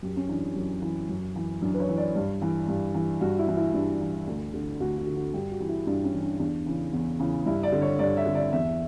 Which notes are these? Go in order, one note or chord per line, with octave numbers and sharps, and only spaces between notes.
F#2 G4
C#4
E3 D4
F#2
E3
F#2
E3
F#2 D4
B4
C#5
E3
D5
G2
E3
G2
E3
G2 F#4
E4
E3
E4
G2 D4
E3
D2
D3
D2 F#4
F#4
D3
F#4
G2 G4
F#4
E3
E4
G2 D4
C#4
E3
D4
E2 D4
C#3 E3
E2
C#3 E3
G2 E4
D5
D3
C#5
G2 D5
E5
D3
D5
E2 E5